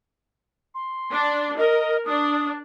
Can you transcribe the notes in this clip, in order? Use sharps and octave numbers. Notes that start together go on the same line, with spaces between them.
C6
D4
A#4 D#5
D4 D#6